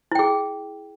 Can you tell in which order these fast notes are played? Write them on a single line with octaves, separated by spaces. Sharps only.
E4 G5 G#4